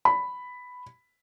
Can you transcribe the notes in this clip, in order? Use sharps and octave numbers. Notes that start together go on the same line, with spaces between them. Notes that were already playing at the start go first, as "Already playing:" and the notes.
B5